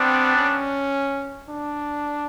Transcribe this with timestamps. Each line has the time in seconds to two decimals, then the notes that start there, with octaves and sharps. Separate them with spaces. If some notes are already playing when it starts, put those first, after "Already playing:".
Already playing: G3 B3 C4 D4
0.36 C#4
1.49 D4